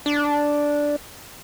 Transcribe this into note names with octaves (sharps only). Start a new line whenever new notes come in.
D4